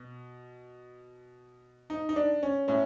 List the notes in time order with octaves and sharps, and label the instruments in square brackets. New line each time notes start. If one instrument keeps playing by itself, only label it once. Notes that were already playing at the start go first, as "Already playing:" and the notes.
Already playing: [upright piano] B2
D#4
D#4
D4
C#4
A2 C#4